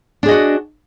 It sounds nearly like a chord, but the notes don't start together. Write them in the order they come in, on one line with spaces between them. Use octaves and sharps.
D4 G#4 D#5 F#4